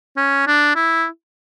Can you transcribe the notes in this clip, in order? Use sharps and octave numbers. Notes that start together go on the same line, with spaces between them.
C#4
D4
E4